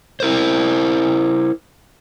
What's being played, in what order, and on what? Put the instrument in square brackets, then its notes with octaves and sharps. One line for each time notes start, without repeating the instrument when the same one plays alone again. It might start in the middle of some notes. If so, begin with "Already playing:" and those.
[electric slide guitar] E4 A#4 C5